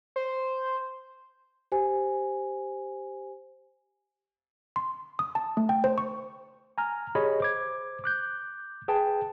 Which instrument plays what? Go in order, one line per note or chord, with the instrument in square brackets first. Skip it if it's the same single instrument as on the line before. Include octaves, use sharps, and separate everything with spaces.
[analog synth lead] C5
[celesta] G4 C5 G#5
[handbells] C6
D#6
A5
A3
G5
C5
C#6
[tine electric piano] G#5 A#5 F6
G4 G#4 C#5 D#5 B5
C5 D6 G#6
D6 F#6 G6
G#4 B4 G5 A5